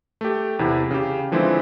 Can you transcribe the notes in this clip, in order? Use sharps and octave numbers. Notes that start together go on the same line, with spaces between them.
A3 G4
E2 C3 E4
C#3 G4
D3 E3 F3 G#3 C4 E4